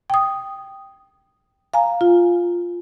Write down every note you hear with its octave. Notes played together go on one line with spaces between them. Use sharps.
G5 D#6
F5 G#5 A#5
F4